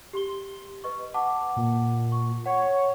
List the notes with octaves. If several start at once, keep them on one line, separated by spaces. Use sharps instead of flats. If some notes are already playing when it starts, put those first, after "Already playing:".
G4 C6 G7
B4 D#5 C#6
F#5 A5 D6
A#2
C#6
C#5 F#5